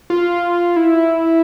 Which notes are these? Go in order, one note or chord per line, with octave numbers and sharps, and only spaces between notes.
F4
E4